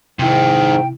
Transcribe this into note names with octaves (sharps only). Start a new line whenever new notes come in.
F2 G#2 C3 D#3 E4 G5